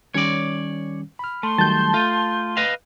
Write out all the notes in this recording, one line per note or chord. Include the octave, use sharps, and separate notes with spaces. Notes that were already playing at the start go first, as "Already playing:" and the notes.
D#3 G3 C#4 C#5 D5
B5 F6
A3 C6
D#3 F#3 G3 A5 G6
A3 F4
B4 D#5 F5